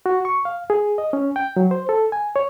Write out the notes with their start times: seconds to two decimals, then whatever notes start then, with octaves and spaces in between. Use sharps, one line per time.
0.06 F#4
0.25 C#6
0.45 F5
0.70 G#4
0.98 D#5
1.13 C#4
1.36 G5
1.57 F#3
1.71 C5
1.89 A4
2.12 G#5
2.36 C#5